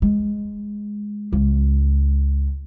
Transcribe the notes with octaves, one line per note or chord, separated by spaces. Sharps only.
G#3
C#2